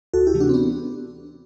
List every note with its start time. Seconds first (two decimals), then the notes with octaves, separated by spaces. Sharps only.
0.14 D2 F#4 A4
0.27 E4 G4
0.34 C3 E3 A3
0.40 D4 F#4
0.49 C4
0.53 B3 D4